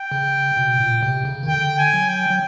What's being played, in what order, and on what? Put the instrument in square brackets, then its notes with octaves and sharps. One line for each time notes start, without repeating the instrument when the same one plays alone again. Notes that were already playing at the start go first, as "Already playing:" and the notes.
Already playing: [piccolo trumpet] G5
[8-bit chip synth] C#3
B2
A#2
C3
C#3
D#3
[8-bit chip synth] D3 [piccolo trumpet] G5
[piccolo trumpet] G#5
[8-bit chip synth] F#3
[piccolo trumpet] G5
[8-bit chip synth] F#3